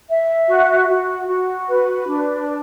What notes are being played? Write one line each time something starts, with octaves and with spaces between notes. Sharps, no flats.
E5
F#4
F#4
F#4
B4
D4